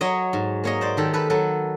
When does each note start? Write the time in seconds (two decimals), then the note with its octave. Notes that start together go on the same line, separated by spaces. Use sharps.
0.01 F#3 C#5 D#5
0.33 G#2
0.64 A#3 C#5 D#5
0.81 C5 D5
0.97 D#3 G4 A4
1.13 A4 B4
1.30 F#3 A4 B4